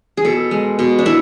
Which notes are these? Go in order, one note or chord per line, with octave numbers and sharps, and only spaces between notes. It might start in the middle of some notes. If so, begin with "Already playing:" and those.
G#4
B2 A4
G#3
B2
D4
B2 E4